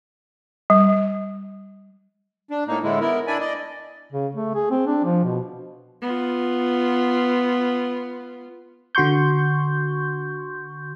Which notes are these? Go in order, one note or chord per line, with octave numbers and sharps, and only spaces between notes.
G3
D4
A2 A#3 D#4
A2 D3 G#3 E4
B3 E4 A#4
D4 E4 D5 G#5 B5
D5 D#5
C#3
A3
G#4
C4
D4
F3
B2
B3 F4
D3 F#4 C6 C#6 G6